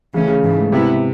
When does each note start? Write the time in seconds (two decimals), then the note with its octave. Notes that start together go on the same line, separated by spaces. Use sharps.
0.13 C#3 E3 A3 C#4
0.28 C#3
0.44 G#2 E3 A3
0.72 C3 G#3 B3 E4